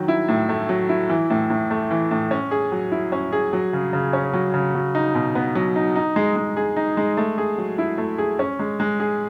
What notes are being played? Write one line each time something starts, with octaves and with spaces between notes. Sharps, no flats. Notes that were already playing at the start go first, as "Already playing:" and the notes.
Already playing: D#3 F#3
E4
A2
A3
F#3
E4
E3
A2
A2
A3
E3
A2
C#4
G#4
F#3
E4
C#4
G#4
F#3
C#3
C#3
C#4
F#3
C#3
F#3
D#4
B2
B3
F#3
D#4
D#4
G#3
G#3
G#4
D#4
G#3
A3
G#4
F#3
E4
A3
G#4
C#4
G#3
G#3
G#4